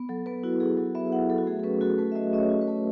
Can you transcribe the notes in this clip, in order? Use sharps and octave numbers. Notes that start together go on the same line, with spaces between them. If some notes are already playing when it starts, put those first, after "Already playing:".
Already playing: B3
F#3 A4
B3 B4
E4 F#4
F#3 G#4
F#3
B3 E5
E4 F#5
F#3 A4
F#4
A3 G#4
A4
C#4 B4
F#4 A4
A3 B4
E5
A3 D#5
C#4 D#5
C#5
F#4
B4
A3